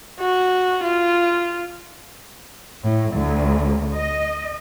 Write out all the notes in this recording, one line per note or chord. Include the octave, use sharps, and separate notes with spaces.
F#4
F4
A2
D2
D#5